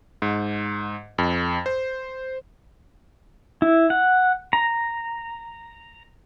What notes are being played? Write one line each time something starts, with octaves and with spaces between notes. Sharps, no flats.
G#2
F2
C5
E4
F#5
A#5